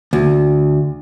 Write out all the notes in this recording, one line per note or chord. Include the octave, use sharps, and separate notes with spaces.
D2